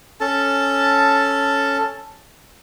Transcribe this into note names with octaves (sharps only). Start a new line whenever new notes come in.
C#4 A4 A5